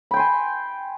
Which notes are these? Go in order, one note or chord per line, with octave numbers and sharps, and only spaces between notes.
G5 G#5 B5 C6